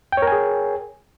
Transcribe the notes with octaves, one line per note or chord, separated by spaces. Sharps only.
G#4 A#4 C#5 G5 G#5